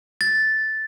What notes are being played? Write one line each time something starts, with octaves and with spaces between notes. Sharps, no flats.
A6